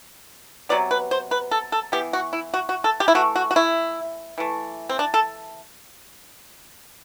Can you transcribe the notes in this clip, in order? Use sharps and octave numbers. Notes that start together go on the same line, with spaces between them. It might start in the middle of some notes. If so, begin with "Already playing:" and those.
C3 F#3 B3 D5
B4
C5
B4
A4
A4
E3 B3 G4
F#4
E4
F#4
F#4
A4
G4
E4
E3 A3 F#4
F#4
F#4
E4
E3 A3
C4
D4
A4